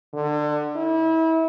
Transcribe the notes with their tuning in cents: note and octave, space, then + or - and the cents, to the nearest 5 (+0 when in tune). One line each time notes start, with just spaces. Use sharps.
D3 +25
E4 -30